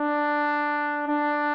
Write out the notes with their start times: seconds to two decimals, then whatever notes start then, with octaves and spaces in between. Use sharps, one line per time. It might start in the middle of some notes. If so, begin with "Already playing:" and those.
Already playing: D4
1.08 D4